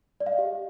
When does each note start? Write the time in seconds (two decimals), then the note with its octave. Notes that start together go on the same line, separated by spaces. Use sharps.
0.20 D5
0.26 F5
0.32 D#5
0.38 G4